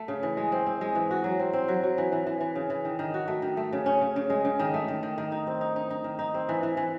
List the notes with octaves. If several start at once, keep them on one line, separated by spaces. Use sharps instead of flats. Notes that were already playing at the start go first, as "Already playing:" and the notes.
Already playing: A3
C#3
E3
G#3
C4
C4
G#3
E3
F#4
F#3
C4
C4
F#3
F#3
E3
E3
E3
E3
C#3
E3
D#3
D#3
F#4
A3
D#3
A3
C#3
C#4
C#3
C#3
G#3
C#3
D#3
A3
D#3
D#3
D#3
D#4
C4
D#4
D#4
D#4
D#3
D#4
C4
E3
E3
E3